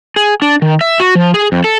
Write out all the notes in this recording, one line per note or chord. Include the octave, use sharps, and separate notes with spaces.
G#4
D4
D#3
E5
F#4
F3
G#4
F2
A4